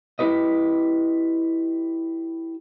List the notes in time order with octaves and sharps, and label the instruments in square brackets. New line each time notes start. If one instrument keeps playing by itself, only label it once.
[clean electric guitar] E4 G4 B4 D#5